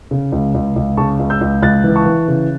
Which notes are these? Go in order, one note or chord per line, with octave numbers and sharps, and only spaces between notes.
C#3
C#2
C#2
C#2
C#3 A5 C#6
C#2
E6 G6
C#2
C#2 F#6 A6
E3
A5 C#6
E3
C#3